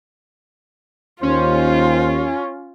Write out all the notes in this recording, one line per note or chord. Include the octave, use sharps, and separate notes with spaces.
D#2 C#4 F4 C5